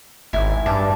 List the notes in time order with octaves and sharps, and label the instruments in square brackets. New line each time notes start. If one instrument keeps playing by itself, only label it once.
[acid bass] G#1 [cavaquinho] E4 G#5
[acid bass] G2 [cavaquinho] A5 D6